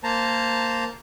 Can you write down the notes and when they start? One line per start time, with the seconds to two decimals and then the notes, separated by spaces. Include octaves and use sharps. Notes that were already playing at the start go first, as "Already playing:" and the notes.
0.04 A#3 C5 A5 A#5